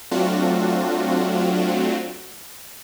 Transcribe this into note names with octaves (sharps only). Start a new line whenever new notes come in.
F#3 A3 C4 D4 F4 F#4